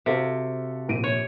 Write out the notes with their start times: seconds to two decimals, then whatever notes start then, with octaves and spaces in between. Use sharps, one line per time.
0.06 C3 F#4 A4 F5
0.89 A#1 D7 D#7
1.04 C#5